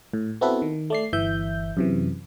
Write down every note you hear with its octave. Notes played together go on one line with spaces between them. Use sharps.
A2
B3 C4 E4 F#4 A4 B4
D#3
A3 D5 C7
G1 E3 E5 G6
F#2 C3 E3